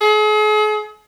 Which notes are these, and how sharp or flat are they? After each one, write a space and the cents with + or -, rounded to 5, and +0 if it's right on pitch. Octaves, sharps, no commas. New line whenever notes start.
G#4 +40